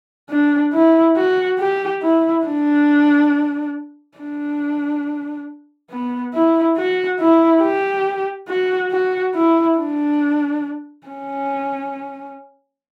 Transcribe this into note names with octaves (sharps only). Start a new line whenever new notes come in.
D4
E4
F#4
G4
E4
D4
D4
B3
E4
F#4
E4
G4
F#4
F#4
E4
D4
C#4